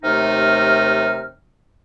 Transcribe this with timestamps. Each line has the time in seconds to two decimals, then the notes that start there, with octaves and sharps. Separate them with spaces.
0.03 D#2 C3 A3 D#4 F6